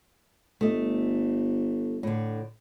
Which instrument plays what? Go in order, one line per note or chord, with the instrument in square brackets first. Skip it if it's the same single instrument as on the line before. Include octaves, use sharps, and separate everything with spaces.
[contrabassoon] G1 [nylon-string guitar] A3 D#5
[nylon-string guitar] A2 D3